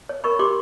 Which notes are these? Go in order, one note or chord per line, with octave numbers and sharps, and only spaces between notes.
C#5
A#4 B5 C#6
G4 C6 D6